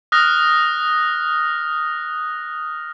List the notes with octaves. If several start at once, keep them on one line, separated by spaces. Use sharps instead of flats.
D#6 F6 F#6 A#6